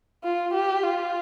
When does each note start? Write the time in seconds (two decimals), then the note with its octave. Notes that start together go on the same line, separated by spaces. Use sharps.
0.24 F4
0.54 G4
0.83 F4